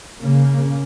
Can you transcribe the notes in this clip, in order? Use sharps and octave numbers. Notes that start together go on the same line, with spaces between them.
C#3 A#3